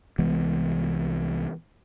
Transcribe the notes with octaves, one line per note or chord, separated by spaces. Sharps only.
C2 E3 G#3 B3